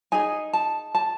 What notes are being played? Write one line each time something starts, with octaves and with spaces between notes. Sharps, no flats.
D#4 G#4 G#5
A5
A5